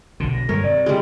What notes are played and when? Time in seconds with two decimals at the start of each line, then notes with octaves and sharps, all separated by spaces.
0.20 B1 D3
0.33 A#6
0.49 G2 D#3 G#3 A#4 C#5
0.64 C3 D5
0.86 G3 G#3